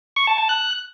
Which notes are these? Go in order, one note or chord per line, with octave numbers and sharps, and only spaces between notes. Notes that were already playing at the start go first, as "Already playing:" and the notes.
C#6
A5
A5
F#6